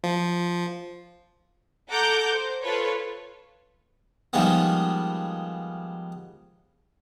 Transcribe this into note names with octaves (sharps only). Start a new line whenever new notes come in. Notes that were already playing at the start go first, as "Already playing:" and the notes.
F3
A4 F#5 A#5 D6 G6
C5
F4 A4 B4 C#5
D#3 F3 G3 G#3 B3